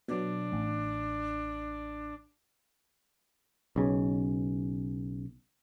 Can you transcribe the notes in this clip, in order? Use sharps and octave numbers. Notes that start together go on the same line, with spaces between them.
B2 F#3 D4
A1
B1 C#3